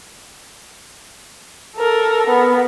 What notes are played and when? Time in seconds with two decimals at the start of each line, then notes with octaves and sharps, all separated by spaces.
1.76 A4 A#4
2.27 B3